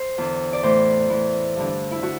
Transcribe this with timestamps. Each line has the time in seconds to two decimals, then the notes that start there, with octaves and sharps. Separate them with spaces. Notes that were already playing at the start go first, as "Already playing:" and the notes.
Already playing: C5
0.18 E2 D3
0.53 D5
0.63 A2 E3 C5
1.10 A2 E3
1.56 G2 D3
1.91 E4
2.02 D3 F#4